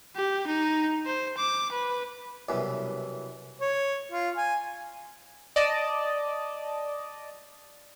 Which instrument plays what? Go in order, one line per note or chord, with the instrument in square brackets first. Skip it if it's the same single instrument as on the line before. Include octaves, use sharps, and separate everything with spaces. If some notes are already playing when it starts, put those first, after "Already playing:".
[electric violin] G4
D#4
C5
D6
B4
[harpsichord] C2 F#2 B2 E3
[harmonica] C#5
F4
G#5
[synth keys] D5 D#5 A5 D6